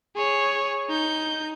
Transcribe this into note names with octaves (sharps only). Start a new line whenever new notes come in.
G#4 C#5
D#4 G6